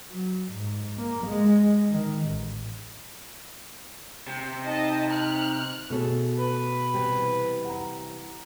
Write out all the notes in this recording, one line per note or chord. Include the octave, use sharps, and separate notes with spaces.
F#3
G#2
A#3
G#3
D#3
A1
C3
D#4 D#5 A5
F6 F#6
B2 A3 G#4 A4 C#5
B4
C3 E3 G3
F#5 A#5